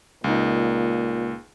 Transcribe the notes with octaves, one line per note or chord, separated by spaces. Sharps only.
C#2 A#2 D#4